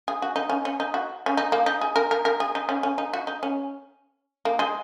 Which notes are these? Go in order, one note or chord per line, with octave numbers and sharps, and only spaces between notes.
G#4
F#4
D#4
C#4
C#4
D#4
F#4
C#4
D#4
A#3
D#4
G#4
A#4
A#4
A#4
G#4
D#4
C#4
C#4
D#4
F#4
D#4
C#4
A#3
G#3